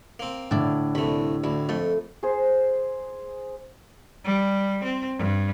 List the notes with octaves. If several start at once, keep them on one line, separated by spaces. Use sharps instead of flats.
A#3 C4
A2 D3 E4 D5
C2 A3 B5
D2 E4
F2 A3
G#4 C5
G3
C4
G2